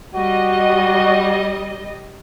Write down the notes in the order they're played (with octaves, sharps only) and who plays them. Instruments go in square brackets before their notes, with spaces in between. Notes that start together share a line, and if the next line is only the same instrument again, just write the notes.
[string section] G3 D#5 [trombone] F#4